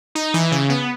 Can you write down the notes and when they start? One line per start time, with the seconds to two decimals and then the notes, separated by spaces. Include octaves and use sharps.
0.15 D#4
0.34 E3
0.52 C#3
0.69 B3